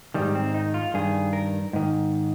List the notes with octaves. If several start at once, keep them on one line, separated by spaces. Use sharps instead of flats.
G#2 D#3 G3
C4
D#4
F4
G2 D#3 G#4
A#4
G#2 D#3